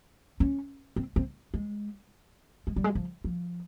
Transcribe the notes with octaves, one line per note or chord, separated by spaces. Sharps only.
C#4
C4
C4
G#3
G#3
G3
G#3
F3
F3